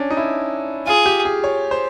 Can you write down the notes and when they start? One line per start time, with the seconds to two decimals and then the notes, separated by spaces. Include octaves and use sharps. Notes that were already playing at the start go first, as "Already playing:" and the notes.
Already playing: C#4 D4
0.10 D#4
0.17 E4
0.87 F4 G#4
1.06 G4
1.25 G#4
1.44 C#5
1.71 C5